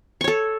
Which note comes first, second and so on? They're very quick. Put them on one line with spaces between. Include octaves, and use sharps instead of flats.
C#6 C#5 A4